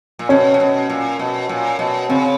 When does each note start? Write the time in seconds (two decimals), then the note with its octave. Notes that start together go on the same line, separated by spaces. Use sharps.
0.19 A#2
0.29 B2 C#4
0.54 C3
0.60 B2
0.90 A#2
1.19 B2
1.49 A#2
1.79 B2
2.09 C#3 C4